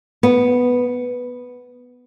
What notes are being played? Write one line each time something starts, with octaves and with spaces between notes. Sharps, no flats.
B3